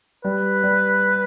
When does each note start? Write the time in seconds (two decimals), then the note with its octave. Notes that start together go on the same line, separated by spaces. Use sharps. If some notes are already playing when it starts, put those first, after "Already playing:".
0.24 G3 B4
0.63 G3